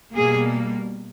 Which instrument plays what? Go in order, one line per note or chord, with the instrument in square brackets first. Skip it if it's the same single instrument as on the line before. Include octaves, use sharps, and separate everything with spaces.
[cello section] B2 G3 A#3 G#4